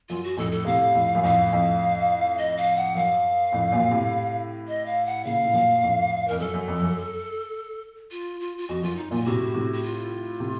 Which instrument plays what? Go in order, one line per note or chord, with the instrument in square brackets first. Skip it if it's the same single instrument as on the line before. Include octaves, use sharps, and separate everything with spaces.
[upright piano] F#2 [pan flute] F4
[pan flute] F#4
[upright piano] F2 A2 [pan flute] A4
[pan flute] A4
[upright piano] A2 C3 [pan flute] F5
[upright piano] F2 A2
F#2
[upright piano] F2 A2 [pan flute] F5
[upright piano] F2 A2
[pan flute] D#5
F5
F#5
[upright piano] F#2 [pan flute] F5
[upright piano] F2 A2
F#2 A#2
A2 C3
[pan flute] D#5
F5
F#5
[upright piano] A#2 C#3 [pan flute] F5
[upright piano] A2
F#2 A#2
F2 A2
[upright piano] F2 [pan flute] A#4
[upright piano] F#2 [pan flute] A4
[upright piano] F#2
F2
F#2
[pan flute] F4
F4
F4
[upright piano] F2 [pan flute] F#4
[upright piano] F#2 [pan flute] F4
[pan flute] D#4
[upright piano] F#2 A#2 [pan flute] F4
[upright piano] A2 C3 [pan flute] F#4
[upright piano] A2 C3
[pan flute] F#4
F4
[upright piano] A2 C3